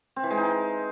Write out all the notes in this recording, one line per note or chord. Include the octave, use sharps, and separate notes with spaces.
C4
E3
G#3
D#4